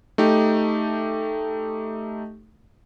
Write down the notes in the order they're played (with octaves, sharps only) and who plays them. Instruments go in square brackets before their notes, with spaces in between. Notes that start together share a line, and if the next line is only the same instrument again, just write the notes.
[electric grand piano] A3 D#4 G4